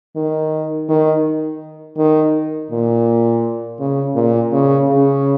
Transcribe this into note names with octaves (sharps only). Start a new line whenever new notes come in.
D#3
D#3
D#3
A#2
C#3
A#2
C#3
C#3